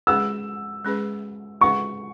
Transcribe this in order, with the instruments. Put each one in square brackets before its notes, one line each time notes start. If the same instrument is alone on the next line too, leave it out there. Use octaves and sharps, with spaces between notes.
[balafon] G#3 C#4 G#4 B4 [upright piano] E6
[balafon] G#3 C#4 G#4 B4
[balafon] G#3 C#4 G#4 B4 [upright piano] C#6